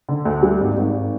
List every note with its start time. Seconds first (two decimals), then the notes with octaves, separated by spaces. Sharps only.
0.09 D3
0.25 D2
0.43 G3
0.60 G#1
0.77 G#1